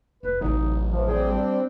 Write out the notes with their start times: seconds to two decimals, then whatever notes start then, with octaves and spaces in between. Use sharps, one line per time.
0.23 F1 F#2 B4
0.41 A1 C3 F#3 D#4
0.92 E3 F3
1.07 C4 D4 G#4 G5
1.28 G3